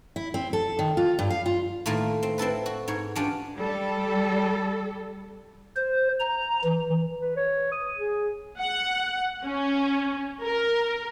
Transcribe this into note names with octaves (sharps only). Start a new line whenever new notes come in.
E4
C4
A4
D#3
F4
G2
F5
F4
A2 D#3 A3 A#3 F4
C4
C4 E4 A4 B4
F#4
G#2 C#5
C#4 D4 F4 G4
G3 A4
C5
A#5
E3
B4
C#5
D#6
G#4
F#5
C#4
A#4